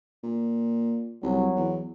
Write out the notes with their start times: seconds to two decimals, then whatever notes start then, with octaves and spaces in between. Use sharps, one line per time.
0.23 A#2
1.23 C2 F#3
1.56 E2